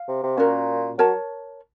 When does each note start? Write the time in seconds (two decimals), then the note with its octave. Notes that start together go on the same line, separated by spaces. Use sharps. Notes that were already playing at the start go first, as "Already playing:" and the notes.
Already playing: F5
0.08 C3
0.23 C3
0.37 A#2 C#4 F#4 A#4
0.98 F#3 A#4 C#5 A5